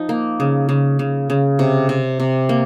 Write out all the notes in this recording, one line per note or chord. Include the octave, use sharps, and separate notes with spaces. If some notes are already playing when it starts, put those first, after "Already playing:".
Already playing: F3 D#4
A#3
C#3
C#3
C#3
C#3
C3
C3
C3
A#3